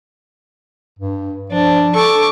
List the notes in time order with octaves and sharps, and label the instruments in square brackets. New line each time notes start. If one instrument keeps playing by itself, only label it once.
[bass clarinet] G2
[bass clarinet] F3 [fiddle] D4
[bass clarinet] A4 [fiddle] C#6 D6